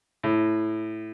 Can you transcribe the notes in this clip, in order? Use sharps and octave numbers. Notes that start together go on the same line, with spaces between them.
A2